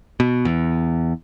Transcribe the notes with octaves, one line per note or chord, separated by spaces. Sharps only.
B2
E2